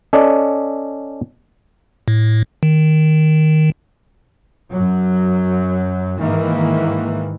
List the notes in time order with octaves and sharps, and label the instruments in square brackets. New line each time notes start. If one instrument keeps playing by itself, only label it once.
[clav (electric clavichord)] C#4 A4 D5 D#5
[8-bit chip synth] A2
D#3
[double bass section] F#2 F#3
G#2 D#3 E3 A#3